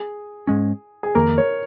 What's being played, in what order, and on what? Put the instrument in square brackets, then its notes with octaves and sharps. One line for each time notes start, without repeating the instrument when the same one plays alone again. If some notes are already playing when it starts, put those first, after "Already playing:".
Already playing: [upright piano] G#4
[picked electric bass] G#2 G#3 C#4
[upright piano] G#4
[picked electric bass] F2 D#3 A#3 [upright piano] A#4
[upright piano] C#5